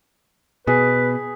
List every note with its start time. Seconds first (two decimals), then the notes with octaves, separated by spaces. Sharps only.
0.67 B2 G#4 B4